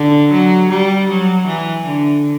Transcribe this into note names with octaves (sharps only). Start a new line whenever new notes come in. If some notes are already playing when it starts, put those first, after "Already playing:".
Already playing: D3
F#3
G3
F#3
E3
D3